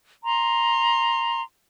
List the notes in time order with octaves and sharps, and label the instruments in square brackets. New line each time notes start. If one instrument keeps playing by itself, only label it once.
[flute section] A#5 C6